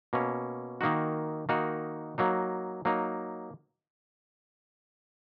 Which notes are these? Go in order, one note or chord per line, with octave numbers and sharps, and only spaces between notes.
B2 A#3 C#4
D#3 A#3 D#4 F#4
D#3 A#3 D#4 F#4
F#3 A#3 D#4
F#3 A#3 D#4